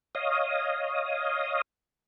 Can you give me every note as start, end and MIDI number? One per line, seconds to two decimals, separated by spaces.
0.15 1.61 73
0.15 1.61 75
0.15 1.61 77
0.15 1.61 87